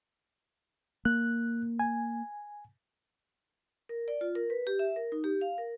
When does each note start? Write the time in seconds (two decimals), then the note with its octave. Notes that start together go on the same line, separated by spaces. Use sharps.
1.05 A#3 F#6
1.79 G#5
3.89 A#4
4.08 D5
4.21 F4
4.35 A#4
4.50 B4
4.67 G4
4.79 E5
4.96 A#4
5.12 D#4
5.24 G4
5.41 F5
5.58 A#4